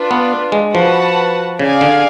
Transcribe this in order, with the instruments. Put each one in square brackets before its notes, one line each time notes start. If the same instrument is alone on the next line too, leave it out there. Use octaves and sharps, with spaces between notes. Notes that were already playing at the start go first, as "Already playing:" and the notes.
Already playing: [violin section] D4 F4 B4
[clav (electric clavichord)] B3
G#3
[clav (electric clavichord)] F3 [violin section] F#4 B4 F#5 A5
[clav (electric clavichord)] C#3 [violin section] G#4 D5 F5 G#5
[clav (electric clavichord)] D3